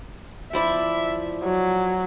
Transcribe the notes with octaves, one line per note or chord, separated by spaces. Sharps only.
F3 E4 D5 E5
F#3